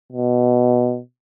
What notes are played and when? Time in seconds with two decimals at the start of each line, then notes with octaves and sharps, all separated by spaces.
0.12 B2